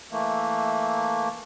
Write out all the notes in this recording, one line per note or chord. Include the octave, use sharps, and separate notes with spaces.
E3 A3 A#3